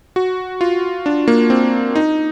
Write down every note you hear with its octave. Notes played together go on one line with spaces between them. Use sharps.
F#4
F4
D4
A#3
C4
D#4